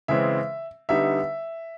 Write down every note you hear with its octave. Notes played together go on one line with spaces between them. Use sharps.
C#3 E3 G#3 C4 E5
D3 G3 B3 D#4 E5